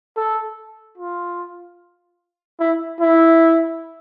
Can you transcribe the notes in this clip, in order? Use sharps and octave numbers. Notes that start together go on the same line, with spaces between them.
A4
F4
E4
E4